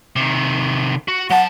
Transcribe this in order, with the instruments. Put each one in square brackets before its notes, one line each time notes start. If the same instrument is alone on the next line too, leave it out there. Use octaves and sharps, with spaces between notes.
[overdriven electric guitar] C3 D#3
F#4
[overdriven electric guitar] F#3 A5 [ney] F#5